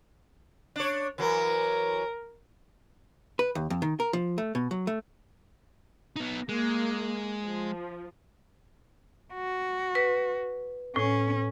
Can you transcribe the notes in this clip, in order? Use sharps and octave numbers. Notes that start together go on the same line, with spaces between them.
D4 C#5
E3 F#3 A#4
B4
D#2
F2
D#3
A#4
F3
A3
B2
F#3
A3
B3 D#4
G#3 A#3
F3
F#4
B4
A2 C#4